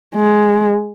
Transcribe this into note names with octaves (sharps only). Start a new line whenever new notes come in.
G#3